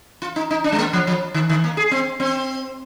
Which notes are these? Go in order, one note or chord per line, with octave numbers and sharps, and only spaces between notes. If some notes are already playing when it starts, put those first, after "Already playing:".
F4
D#4
D#4
D4
G#3
A#3
F3
F3
D#3
D#3
A#3
G#4
C4
C4